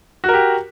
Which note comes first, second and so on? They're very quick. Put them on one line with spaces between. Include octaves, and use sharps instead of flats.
F#4 A#4 G4